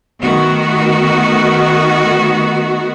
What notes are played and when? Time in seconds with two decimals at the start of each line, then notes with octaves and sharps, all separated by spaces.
0.21 D#3 A3 B3 F#4